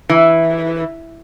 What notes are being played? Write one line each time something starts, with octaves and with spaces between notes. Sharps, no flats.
E3